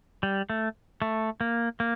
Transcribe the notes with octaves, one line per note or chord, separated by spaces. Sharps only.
G3
A3
A3
A#3
A#3